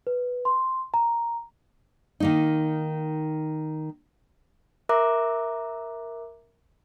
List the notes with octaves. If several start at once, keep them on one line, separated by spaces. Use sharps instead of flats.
B4
C6
A#5
D#3 A#3 D#4
A#4 E5 A#5 D6 F#6